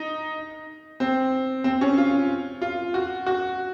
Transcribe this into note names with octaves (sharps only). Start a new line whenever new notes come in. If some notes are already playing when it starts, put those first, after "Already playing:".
Already playing: D#4
C4
C4
C#4
F4
F4
F#4
F#4